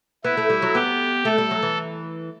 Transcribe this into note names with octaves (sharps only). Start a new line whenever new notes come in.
B3 E4
A3
G3
F#3
B3 G4
A3 A4
G3
F#3
E3